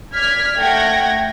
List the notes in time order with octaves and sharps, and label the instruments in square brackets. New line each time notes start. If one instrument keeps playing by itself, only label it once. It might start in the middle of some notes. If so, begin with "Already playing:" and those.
[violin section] D5 F6 G#6 B6
A3 F#5 G5 G#6 A#6